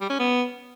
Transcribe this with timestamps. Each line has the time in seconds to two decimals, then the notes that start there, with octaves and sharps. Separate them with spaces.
0.01 G3
0.10 C#4
0.19 B3